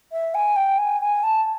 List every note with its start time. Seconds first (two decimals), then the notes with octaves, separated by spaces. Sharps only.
0.11 E5
0.34 G#5
0.56 G5
0.78 G#5
1.01 G#5
1.23 A5